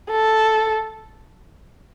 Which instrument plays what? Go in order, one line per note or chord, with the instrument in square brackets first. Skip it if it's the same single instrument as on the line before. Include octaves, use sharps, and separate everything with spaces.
[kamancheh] A4